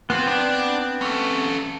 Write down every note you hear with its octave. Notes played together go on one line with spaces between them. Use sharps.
B3 C4 F4 C5
D4 D5
C#4 A4